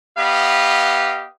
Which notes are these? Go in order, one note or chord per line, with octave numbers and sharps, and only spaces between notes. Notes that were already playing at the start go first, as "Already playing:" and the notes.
B3 G4 B4 D#5 F5